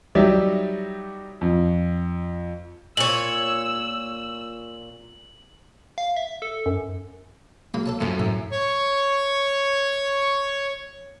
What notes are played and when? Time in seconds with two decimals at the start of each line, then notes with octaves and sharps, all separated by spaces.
0.15 F#3 G3 D#4 G4 D5 E5
1.41 F2
2.97 A#2 C#5 E6 F#7
5.98 F5
6.16 E5
6.42 A4
6.66 F#2
7.74 F#3 G#3 A#3 B5
7.86 A4 C#5 A5
8.00 F#2 A2 F3 A4
8.20 A2 E5
8.52 C#5 C#6